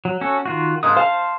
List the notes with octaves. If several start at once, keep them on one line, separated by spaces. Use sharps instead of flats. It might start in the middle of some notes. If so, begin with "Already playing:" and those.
F#3
C#4 F#4 A4
D#3 F4 F#4
G#2 A#3 D4 D#6
C5 F5 A5 F6